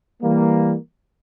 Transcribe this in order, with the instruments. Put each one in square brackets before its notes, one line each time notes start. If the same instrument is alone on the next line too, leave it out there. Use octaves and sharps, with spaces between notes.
[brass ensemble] E3 G3 A#3